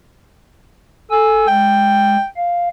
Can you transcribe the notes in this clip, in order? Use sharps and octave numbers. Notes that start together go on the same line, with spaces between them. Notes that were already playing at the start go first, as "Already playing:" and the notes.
A4 G#5 E6
G#3 G5
F5